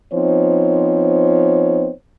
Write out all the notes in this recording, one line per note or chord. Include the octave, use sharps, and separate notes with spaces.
F3 B3 C4 D#4 C5 C#5